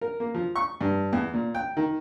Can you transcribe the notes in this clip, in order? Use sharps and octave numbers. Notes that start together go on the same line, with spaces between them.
A#4
A#3
F3
C#6
G2
E2
A#2
G5
D#3